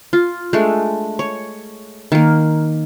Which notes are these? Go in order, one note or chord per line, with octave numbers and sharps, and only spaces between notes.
F4
G#3 A3 D4
C#5
D#3 A#3